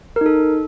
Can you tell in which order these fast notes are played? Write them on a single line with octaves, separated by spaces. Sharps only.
A#4 D#4 A4